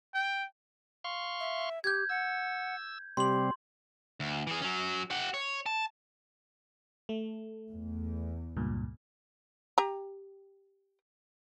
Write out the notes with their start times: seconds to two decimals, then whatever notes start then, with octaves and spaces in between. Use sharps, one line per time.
0.14 G5
1.04 F5 C6 C#6
1.40 E5
1.84 G4 G6 G#6
2.09 F#5 E6
3.17 C3 G3 C4 G4 C6 F#7
4.20 D2
4.47 E3 G#4
4.62 F#3 C#4
5.11 G4 F#5
5.34 C#5
5.66 A5
7.09 A3
7.68 E2
8.57 C#2 G2 A#2
9.78 G4 A#5